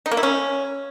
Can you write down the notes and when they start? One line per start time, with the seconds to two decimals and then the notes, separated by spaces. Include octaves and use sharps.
0.06 D#4
0.11 A#3
0.17 E4
0.23 C#4